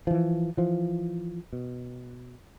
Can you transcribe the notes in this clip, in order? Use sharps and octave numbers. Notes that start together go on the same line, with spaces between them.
E3 F3
E3 F3
B2